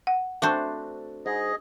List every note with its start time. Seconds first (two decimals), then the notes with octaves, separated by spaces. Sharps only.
0.07 F#5
0.42 A3 C4 D4 F#4 C5
1.26 G#2 G#4 D#5